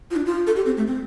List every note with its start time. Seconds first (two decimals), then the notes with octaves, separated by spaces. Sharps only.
0.11 F4
0.16 D4
0.26 F4
0.47 A4
0.56 G4
0.66 C4
0.77 A3
0.87 C4